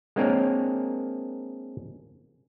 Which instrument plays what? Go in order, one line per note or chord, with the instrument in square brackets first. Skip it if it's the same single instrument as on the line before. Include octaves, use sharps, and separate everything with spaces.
[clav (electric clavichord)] G#3 A#3 C4 D4 A#4 C#5